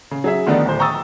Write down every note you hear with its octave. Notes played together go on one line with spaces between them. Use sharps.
C#3
F#3 G#4 E5
D3 D#3 F3 A3 B3 D4
D1 C5
G5 A#5 C#6 D#6 E6 A6